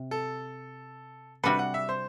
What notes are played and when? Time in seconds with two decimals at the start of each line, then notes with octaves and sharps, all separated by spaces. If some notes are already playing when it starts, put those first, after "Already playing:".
Already playing: C3
0.11 A4
1.43 C3 G3 D4 F#4 A4 B4
1.59 F#5
1.74 E5
1.89 C5